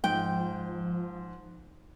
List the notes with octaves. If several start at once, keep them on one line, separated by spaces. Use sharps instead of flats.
G#2 F3 G5